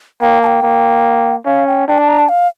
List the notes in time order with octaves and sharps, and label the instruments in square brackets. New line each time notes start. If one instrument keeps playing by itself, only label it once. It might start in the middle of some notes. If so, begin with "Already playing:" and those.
[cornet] A#3 [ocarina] G5
[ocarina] A5
G5
[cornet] A#3
[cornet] C#4 [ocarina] F5
[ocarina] G5
[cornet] D4 [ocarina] G5
[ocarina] A5
A#5
A5
F5